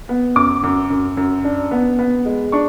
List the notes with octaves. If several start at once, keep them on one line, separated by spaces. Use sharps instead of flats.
B3
F#2 D6
F#2
F#2
F#2
D4
B3
B3
G#3
D4 C#6